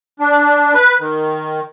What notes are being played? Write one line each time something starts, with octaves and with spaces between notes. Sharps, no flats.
D4
B4
D#3